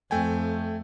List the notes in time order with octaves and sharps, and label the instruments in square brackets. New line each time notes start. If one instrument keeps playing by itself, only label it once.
[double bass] F2 [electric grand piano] A3 G5 G#5